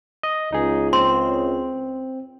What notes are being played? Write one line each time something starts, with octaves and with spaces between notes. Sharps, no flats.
D#5
C#2 D#4 G#4
C4 C6